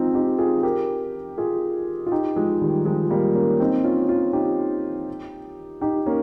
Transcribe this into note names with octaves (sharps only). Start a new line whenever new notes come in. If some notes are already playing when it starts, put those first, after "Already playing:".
Already playing: F3 G#3 C4 D#4 F4
D#4 G4
F4 G#4
G4 A#4
F4 G#4
F4
D#4 G4
F3 G#3
D#3 G3
F3 G#3
G3 A#3
A#3 C#4
C4 D#4
C#4 F4
C#4 F4
D#4 G4
D#4 G4
A#3 C#4